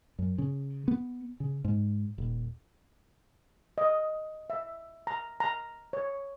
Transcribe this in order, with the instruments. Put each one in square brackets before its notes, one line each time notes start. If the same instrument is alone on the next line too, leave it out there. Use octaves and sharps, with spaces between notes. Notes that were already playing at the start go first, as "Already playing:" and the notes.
[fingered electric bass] F#2
C#3
B3
C#3
G#2
D#1
[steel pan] D#5
E5
A#5
A#5
C#5